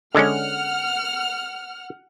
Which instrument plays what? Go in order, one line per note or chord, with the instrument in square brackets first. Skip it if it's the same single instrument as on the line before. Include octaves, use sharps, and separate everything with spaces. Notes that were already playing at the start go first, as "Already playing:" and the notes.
[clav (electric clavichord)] D3 G#3 C#4 [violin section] F#5 F6